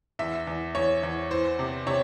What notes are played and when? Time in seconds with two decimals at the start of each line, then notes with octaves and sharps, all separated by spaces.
0.19 E2 E5
0.47 E2
0.75 E2 C#5
1.03 E2
1.30 E3 C5
1.59 C3
1.87 C3 C#5